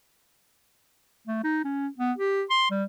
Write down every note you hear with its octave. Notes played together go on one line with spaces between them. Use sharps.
A3
D#4
C#4
B3
G4
C6
G3